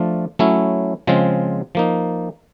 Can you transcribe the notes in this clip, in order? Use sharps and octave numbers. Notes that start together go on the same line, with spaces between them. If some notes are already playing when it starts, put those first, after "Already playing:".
Already playing: F3 A3 D4 F4
F#3 A3 C#4 E4
C#3 F3 G#3 C4 F4
F3 A#3 D#4